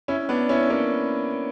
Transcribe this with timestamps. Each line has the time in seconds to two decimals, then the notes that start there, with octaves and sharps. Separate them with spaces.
0.08 C#4 E4
0.29 B3 D4
0.49 C#4 E4
0.70 A#3 C#4